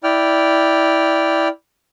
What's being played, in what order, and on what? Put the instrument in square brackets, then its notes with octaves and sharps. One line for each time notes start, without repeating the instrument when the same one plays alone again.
[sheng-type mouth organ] E4 D5 G5 F6